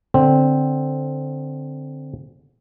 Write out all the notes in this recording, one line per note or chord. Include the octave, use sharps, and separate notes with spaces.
D3 C4